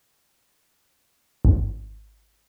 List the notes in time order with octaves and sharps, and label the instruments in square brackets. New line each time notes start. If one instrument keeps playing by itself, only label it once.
[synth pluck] G#1